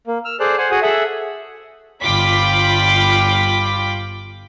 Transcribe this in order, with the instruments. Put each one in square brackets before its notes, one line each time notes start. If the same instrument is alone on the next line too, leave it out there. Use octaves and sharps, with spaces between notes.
[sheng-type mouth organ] A#3
E6 F6
G#4 A4 C5 D5 F#6
C5 F#5 G#5
F#4 G#4 F#5 G#5 D#6
G#4 A4 E5 F#5
[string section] G1 F4 G5 B5 D6 B6